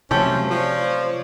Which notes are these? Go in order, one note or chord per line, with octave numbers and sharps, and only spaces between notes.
C3 F3 F#3 A3 C#4 G4 A4 C5
F3 C#5 D5